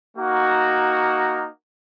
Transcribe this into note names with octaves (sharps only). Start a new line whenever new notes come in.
A#3 D#4 F#4